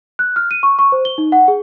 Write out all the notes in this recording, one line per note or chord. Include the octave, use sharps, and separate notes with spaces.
F#6
F6
D#7
C#6
C#6
C5
G7
D#4
F#5
G#4